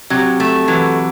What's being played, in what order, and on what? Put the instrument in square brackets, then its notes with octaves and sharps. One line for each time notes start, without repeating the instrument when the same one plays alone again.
[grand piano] C3 [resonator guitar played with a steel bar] F#3
[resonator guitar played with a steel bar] A3
[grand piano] E3 [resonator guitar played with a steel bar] F#3